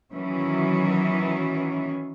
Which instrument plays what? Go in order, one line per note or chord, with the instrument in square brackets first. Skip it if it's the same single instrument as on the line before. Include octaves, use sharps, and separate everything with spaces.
[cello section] D#3 E3 F#3 C#4